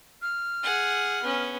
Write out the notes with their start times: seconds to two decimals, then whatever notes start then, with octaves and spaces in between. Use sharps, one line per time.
0.22 F6
0.63 G#4 F#5
1.23 B3 C#4